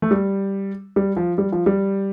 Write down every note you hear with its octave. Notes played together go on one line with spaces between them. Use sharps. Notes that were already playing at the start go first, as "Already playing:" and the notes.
A3
G3
G3
F3
G3
F3
G3